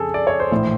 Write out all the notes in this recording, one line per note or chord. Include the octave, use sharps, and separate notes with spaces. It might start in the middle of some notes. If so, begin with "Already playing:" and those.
Already playing: F2 C#3 G#4 A4
D5
C#5
C5
A#1 A2 E3